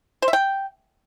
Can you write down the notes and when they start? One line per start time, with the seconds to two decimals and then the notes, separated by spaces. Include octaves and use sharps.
0.22 C5
0.28 E5
0.33 G5